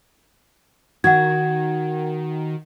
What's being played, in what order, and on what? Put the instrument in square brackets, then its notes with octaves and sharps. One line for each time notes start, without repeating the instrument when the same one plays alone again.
[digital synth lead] D#3 [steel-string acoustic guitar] F#4 [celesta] F#5 G#6